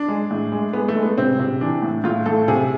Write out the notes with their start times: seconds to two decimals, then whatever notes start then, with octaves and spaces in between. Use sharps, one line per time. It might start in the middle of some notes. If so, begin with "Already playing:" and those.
Already playing: D4
0.08 G#3
0.31 A2
0.52 G#3
0.73 G#3 B3
0.88 A3
0.96 G#3
1.03 B3
1.18 C3 C4
1.39 C3
1.61 E3 D4
1.82 A2
2.04 A2 F4
2.26 A2 A4
2.48 C3 G#4